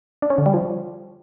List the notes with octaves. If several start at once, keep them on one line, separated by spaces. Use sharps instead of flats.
D4
C#4
D3
G3
F3